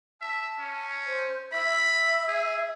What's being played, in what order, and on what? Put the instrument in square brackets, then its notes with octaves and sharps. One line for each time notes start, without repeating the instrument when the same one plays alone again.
[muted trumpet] E5 [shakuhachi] A5
[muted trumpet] C#4
[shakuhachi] C5
[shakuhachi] E5 [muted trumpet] B5
[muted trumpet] G#4